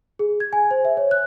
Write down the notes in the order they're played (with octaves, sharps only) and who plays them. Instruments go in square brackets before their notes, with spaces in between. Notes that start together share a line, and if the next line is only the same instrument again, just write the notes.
[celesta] G#4
G#6
G#5
C5
E5
C#5
F#6